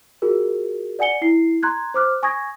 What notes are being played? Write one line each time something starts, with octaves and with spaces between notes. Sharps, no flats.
F4 F#4 G#4 A#4
D5 F#5 G#5 C#7 G7
E4 C7
A#5 C6 F#6 G#6
C5 D6 F6 F#6
G#5 C#6 D#6 G#6 A#6